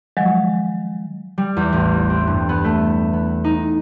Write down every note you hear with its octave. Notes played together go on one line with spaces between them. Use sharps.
D#3 F3 F#3 G#3
G3
E2
A1
C4
G2
B3
A3
B3
D#4